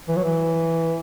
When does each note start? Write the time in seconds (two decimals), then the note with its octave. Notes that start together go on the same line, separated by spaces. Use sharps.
0.08 E3
0.16 F#3
0.24 E3